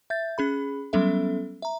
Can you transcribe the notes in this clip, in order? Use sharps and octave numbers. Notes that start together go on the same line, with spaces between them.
E5 G6 A6
C#4 G#4 B5
F#3 G3 B3 C#4 A4 E5
E5 A#5